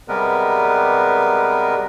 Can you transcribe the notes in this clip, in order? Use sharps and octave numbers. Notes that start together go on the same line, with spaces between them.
C3 G3 G#3 B3 A#4 B4